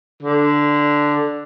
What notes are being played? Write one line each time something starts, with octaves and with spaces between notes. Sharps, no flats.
D3